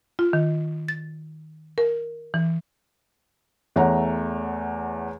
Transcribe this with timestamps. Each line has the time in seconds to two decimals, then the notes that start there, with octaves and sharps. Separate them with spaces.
0.19 F4
0.33 D#3
0.88 A6
1.78 A#4
2.34 E3
3.76 E2 A3 C#5 F#5 A#5